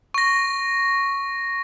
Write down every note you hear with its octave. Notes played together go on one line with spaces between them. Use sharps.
C#6 A#6